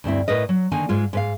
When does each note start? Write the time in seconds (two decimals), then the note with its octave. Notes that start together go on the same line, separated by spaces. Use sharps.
0.04 D2 G2 C4 E4
0.28 A2 A#4 B4 D#5
0.49 F#3
0.71 D3 D#3 A#3 G#5
0.89 G#2 G#3 F4
1.13 G#2 B4 F5